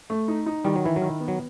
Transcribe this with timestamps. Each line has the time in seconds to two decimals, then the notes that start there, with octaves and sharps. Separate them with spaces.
0.10 A3
0.28 D#4
0.46 D#4
0.65 D#3 G3
0.76 F#3
0.84 E3 E4
0.96 F#3
1.01 D#3
1.20 B3
1.28 F#3